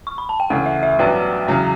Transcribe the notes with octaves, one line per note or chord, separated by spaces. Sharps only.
C#6
B5
A5
G5
D2 C#3 E3 F#5
E5
E5
A1 G2 F#3 B3 D4 G5
E2 C#3 F#3